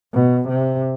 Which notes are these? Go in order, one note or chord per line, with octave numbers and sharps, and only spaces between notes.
B2
C3